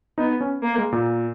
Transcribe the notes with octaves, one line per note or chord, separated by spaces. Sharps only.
B3 D#4
C#4
A#3
G#3
A#2